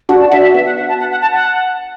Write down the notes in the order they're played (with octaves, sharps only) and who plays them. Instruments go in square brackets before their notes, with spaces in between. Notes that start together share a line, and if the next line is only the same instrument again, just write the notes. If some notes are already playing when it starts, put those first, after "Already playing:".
[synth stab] D4 F#4 [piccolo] F#5
[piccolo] A5
[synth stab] D4 F#4 [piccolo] E5
[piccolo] E5
[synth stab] B3 [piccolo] E5
[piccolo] F#5
F#5
A5
F#5
F#5
A5
F#5